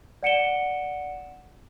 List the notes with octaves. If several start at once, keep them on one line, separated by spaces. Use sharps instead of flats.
D5 F#5 C#7 D7 E7 G7